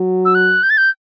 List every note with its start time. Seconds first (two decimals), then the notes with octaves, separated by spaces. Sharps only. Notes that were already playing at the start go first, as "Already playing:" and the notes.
Already playing: F#3
0.25 E6
0.35 F#6
0.63 G6
0.70 A6
0.77 G6